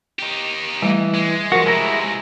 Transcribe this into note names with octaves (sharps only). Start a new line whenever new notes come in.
D#4 G4
E3 G3 A3
G#3
F3 F#4 A#4
C3 E3 G#3 E4 A#5